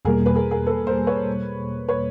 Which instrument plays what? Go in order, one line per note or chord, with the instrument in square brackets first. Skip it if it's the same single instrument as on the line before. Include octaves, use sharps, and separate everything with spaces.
[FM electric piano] E2 B2 G3 A#3 [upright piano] G#4 A#4
[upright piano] B4
G#4 A#4
G#4 A#4
A4 B4
A#4 C5
B4 C#5
B4 C#5